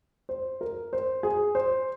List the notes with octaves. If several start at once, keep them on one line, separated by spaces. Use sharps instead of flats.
C5
A#4
C5
G#4
C5